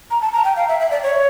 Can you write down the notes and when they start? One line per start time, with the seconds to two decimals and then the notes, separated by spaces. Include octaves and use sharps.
0.11 A#5
0.22 A5
0.33 A#5
0.44 G5
0.56 F5
0.68 E5
0.80 E5
0.91 D5
1.03 C#5